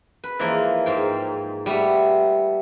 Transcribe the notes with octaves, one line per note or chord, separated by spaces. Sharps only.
B4
E3 F3 G#3 A#3
G#2 F5 G5
G3 A3 B3